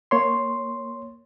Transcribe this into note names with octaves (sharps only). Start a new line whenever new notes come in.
A#3 C#5 C6